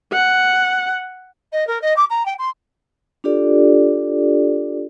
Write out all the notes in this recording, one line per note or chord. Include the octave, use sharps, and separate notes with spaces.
F#5
D#5
A#4
D#5
D6
A#5
G5
C6
D4 F4 G4 A4 D5